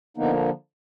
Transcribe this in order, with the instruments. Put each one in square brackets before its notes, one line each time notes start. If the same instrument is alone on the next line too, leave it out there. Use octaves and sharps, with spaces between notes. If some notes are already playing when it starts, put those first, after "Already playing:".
[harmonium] D3 F3 A#3 B3 D#4